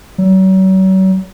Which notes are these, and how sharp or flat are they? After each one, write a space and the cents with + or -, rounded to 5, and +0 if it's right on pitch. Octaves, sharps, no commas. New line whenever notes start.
F#3 +40